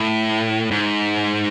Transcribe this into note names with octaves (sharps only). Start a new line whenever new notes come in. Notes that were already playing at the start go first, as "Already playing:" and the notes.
Already playing: A2
G#2